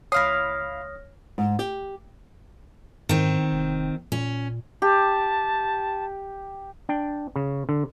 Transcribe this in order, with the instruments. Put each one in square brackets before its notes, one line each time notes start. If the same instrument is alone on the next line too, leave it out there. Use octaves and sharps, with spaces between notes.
[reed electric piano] C#2 D#6 [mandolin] E4 F5 C6 [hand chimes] C#5 F6 A#6
[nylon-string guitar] G#2
G4
[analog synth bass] G#2 [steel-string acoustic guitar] D#3 C4
[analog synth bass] F1
[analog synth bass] A#2 [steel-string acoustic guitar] C#4
[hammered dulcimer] G4 [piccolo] A5
[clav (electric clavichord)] D4 G5
C#3
D3